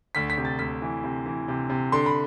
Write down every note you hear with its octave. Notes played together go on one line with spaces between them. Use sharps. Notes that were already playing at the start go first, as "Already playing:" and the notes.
D2 B6
B6
C3
A6
D2 B6
E3
C3
E3
C3
C3
D3 C6
B5